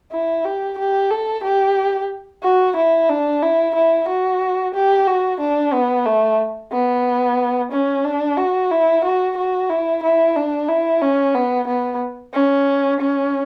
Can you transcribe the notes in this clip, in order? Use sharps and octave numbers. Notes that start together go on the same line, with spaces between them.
E4
G4
G4
A4
G4
F#4
E4
D4
E4
E4
F#4
G4
F#4
D4
B3
A3
B3
C#4
D4
F#4
E4
F#4
F#4
E4
E4
D4
E4
C#4
B3
B3
C#4
C#4